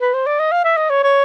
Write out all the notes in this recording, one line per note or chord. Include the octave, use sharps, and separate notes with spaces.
B4
C5
D5
D#5
F5
E5
D#5
C#5
C#5